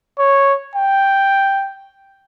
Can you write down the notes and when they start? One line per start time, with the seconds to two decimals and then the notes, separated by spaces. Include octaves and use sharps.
0.19 C#5
0.76 G5